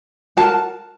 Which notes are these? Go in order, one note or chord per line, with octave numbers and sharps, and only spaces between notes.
F#4 A#4 A5